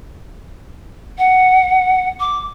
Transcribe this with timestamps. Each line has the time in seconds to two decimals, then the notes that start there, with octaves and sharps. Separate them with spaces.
1.18 F#5
2.20 D6